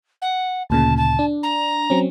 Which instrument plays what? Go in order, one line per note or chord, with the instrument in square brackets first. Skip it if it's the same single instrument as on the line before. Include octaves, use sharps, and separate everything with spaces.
[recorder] F#5
[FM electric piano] D2 A#2 C#3 [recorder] A5
[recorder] A5
[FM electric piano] D4
[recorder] A#5
[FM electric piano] F#3 C4 C#4